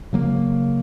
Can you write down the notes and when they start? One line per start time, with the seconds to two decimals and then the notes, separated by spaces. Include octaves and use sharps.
0.13 C#3 F#3 A#3